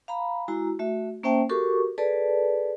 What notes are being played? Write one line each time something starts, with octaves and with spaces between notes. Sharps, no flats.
F5 A#5 B5
G#3 E4 F#4 A#5
A3 F#4 E5
A#3 C#4 C5 E5 G5 A5
F#4 G4 A4 A#4 C#6 D6
G#4 A4 B4 D5 A5